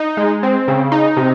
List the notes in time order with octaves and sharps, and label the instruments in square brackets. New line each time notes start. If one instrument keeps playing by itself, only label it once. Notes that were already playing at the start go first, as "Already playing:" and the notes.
Already playing: [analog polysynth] D#4
G#3
C4
C#3
D#4
C3